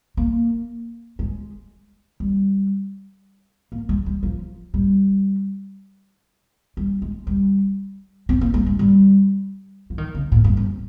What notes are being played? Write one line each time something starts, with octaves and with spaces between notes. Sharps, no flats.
A#3
G#3
G3
A#3
G#3
G3
F3
G3
G3
G#3
G3
C4
A#3
G#3
G#3
G3
F3
D#3
C#3
A#2
G2
F2